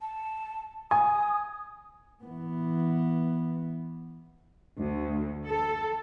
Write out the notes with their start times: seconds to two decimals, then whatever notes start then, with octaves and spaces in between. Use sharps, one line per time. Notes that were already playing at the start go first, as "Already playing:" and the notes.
0.01 A5
0.91 G#5 D#6
2.24 E3 B3
4.79 D2
5.47 A4